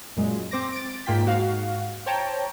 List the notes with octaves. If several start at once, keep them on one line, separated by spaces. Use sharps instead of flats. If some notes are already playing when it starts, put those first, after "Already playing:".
F#2 A#2 G#3
C4 C5 D6 A#6
A6 D7
G#2 A#3 F4 G5 B6
G#2 F#4 F5
C5 C#5 G5 A5 A#5